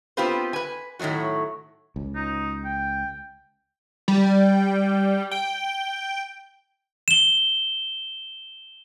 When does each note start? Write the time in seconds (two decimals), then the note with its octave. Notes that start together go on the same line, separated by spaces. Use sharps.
0.17 B3 C4 F4 G4 B4 C5
0.53 B4 G#5
0.99 A2 D#3 F#3 G#3 F#4
1.96 C#2
2.15 D#4
2.65 G5
4.08 G3
5.31 G5
7.08 E7 G7